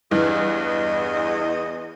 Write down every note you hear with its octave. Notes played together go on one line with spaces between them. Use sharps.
E2 G2 E3 D#5